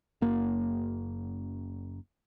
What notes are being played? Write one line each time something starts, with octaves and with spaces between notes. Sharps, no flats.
F#1 A#3